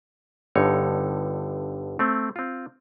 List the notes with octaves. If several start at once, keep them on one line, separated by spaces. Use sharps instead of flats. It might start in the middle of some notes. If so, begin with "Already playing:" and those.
G1 G2 D3 D#4 C#5
A3 C4
C4 F4